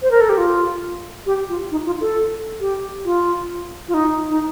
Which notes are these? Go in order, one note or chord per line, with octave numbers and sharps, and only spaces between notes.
C5
A#4
A4
G4
F4
G4
F4
D#4
F4
A4
G4
F4
F4
D#4
D#4